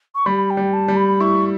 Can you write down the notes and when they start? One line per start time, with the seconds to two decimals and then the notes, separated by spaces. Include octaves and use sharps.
0.15 C#6
0.26 G3 B5
0.50 G5
0.57 G3
0.73 A5
0.88 G3
0.96 B5
1.20 E4 C#6